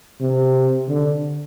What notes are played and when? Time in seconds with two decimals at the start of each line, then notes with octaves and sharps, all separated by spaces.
0.21 C3
0.88 D3